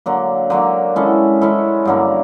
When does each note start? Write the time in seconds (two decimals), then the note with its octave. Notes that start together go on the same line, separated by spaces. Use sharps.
0.06 D3 F#3 A#3
0.50 D3 F#3 A#3
0.96 G#3 C#4 E4 A4
1.41 G#3 C#4 E4 A4
1.85 G2 D3 F#3 A#3